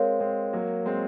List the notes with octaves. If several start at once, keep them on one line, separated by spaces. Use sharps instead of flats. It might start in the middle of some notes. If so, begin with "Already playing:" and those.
Already playing: G#3 C4 A#4 C#5 F5
G#3 C4
F#3 A#3
G#3 C4